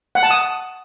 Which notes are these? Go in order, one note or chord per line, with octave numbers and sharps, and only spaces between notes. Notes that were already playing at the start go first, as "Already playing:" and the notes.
F#5
A5
D#6